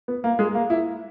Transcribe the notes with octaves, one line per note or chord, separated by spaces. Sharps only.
B3
A#3
G#3
A#3
E4